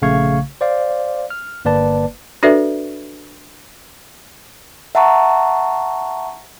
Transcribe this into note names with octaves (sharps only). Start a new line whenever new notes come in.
A#1 C#3 A3 F5 C#6 G#6
C5 D5 F5
F6
G1 A#3 B4 D5 A5
D4 F#4 A4 B4 D5 E5
E5 F#5 A5 A#5 C#6